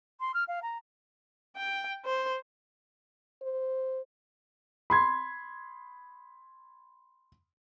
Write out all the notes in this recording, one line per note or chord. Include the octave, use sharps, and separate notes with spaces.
C6
F6
F5
A#5
G5
C5
C5
B5 C6 G#6